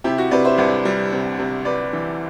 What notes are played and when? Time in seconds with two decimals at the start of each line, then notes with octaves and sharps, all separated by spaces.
0.04 C3 E4 G4
0.18 F#4
0.31 C3 B4 D5
0.44 C5 E5
0.58 C2 B4 D5
0.85 G3
1.12 C3
1.39 C3
1.65 C3 B4 D5
1.93 E3